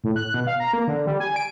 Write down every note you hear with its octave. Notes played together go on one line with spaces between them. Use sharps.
A2
F#6
B2
F5
A#5
A#3
D3
G3
G#5
D7